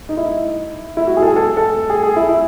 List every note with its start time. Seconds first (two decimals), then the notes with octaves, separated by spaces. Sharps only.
0.09 D#4
0.17 E4
0.97 E4
1.07 F#4
1.17 G#4
1.22 A4
1.27 G#4
1.36 A4
1.57 A4
1.90 G#4
2.03 G#4
2.16 E4
2.29 E4